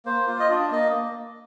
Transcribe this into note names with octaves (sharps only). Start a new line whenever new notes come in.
A#3 C5
F4
D#5
D4 D5
A#3 D#5